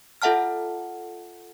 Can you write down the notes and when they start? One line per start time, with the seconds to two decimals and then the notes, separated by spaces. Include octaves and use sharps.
0.22 F4 A4 E5 F#5 A5 F6